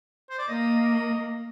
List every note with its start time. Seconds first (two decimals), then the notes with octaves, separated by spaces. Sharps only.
0.30 C5
0.39 D5
0.48 A#3 D#5